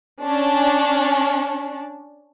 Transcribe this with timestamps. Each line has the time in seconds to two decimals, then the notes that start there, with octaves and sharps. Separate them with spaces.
0.23 C#4 D4